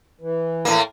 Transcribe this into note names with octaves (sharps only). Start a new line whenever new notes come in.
E3
A2 A#3